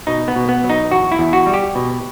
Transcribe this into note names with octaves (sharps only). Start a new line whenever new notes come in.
B2 D#4
B3
B2
B3
F#3
D#4
E2 F#4
E4
E2
F#4
G3
G4
B2